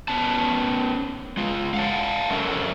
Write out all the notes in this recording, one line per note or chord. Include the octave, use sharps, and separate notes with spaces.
B3 C#4 A5
G#3 F4
F5 F#5 A5
F#3 G#3 A3 C#4 A#4 E5